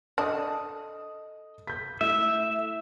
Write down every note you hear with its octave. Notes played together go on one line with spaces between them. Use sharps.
D4 A4 D#5 D#6
G6 B6
A3 E4 E5